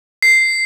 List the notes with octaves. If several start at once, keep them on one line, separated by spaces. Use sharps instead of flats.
C7